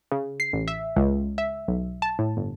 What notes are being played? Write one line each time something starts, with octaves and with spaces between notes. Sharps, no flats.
C#3
C7
A1
E5
C#2
E5
B1
A5
A2
G1